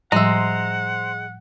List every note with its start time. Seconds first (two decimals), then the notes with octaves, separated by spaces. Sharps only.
0.12 A2 F3 G3 G#3 C5 E5 F#5 A#5